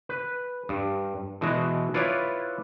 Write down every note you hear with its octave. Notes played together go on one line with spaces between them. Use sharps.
B4
G2
B2 E3 G#3 F#4
E4 F4 B4 C#5 D5 F#5